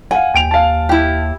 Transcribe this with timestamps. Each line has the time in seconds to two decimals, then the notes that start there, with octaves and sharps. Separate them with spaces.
0.11 F5 F#5 G#5
0.34 D#2 G5 D7 F7
0.51 F5 A5
0.89 E4 G4